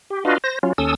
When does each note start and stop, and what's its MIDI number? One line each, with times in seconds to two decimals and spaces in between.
0.10 0.24 67
0.25 0.38 62
0.25 0.38 65
0.25 0.38 66
0.25 0.38 71
0.25 0.38 75
0.25 0.38 77
0.44 0.59 72
0.44 0.59 94
0.63 0.73 54
0.63 0.73 61
0.63 0.73 65
0.78 0.95 39
0.78 0.95 61
0.78 0.95 69
0.78 0.95 87
0.78 0.95 88